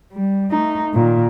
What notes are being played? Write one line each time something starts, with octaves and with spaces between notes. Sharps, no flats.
G3
A3 D#4
A#2 D#3